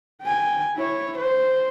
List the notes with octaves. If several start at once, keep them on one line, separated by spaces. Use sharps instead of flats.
G5 G#5
E4 C#5
C5